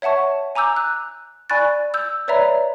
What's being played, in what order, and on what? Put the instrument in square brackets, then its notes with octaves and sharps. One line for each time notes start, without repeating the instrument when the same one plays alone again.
[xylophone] C#5 E5 F#5 A5 C#6
G#5 A#5 D6 E6 G6
F#6
D5 G#5 B5 C#6 F#6 A6
E6 G6
B4 C#5 D5 E5 A#5 B5